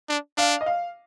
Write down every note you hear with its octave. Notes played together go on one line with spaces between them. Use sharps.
D4
D4 F5
D#5
F5